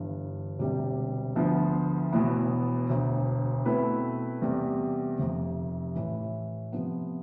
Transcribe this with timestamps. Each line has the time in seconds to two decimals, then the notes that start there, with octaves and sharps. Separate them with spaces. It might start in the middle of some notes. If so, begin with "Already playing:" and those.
Already playing: G1 G2 E3
0.59 E1 D2 C3 G3
1.36 D2 D3 F3 B3 F4
2.12 E1 E2 B2 B3 E4
2.89 E1 D2 D3
3.65 B2 A3 C4 E4 B4
4.42 E2 C3 G3
5.18 F1 F2 C3
5.95 A1 A2 E3
6.72 C3 F3 B3